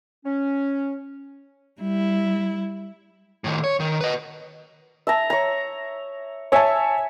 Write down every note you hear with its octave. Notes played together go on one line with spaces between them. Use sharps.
C#4
G3 E4
A2 D#3
C#5
D#3
B4 D#5
E5 A5 A#5
C#5 A#5
C#5 E5 G#5 A5